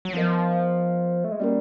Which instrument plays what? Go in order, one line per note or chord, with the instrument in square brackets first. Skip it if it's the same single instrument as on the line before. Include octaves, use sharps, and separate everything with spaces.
[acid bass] F#3
[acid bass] F3 [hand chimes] B3 D4 F4 A#4 D#5
[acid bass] A3
G#3
[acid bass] G3 [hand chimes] A#3 C#4 F#4 A#4